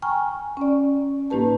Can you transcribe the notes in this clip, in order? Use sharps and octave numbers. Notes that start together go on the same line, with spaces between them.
G5 G#5 A#5 C#6 F6
C#4 D5
A2 A#3 D#4 G4 B4 A5